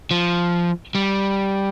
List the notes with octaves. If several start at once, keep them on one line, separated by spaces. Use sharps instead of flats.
F3
G3